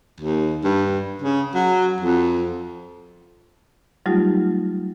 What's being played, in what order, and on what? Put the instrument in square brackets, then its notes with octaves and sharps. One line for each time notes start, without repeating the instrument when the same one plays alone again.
[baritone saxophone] D#2
G2
C#3
F#3
F2
[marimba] F#3 G3 A3 D#4 F4 G4